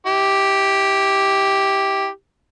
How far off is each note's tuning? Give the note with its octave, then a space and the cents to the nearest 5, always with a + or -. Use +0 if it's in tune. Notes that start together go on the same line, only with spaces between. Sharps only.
E4 -35 G4 +0